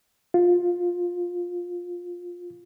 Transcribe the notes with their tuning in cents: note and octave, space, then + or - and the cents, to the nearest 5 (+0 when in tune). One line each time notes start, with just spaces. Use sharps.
F4 +15